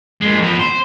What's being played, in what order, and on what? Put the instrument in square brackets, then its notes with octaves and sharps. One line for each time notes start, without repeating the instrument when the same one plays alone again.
[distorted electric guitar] A#2 G#3
F2 B3
C5